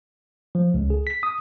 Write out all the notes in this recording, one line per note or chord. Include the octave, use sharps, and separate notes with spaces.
F3
C#2
G#4
B6
D#6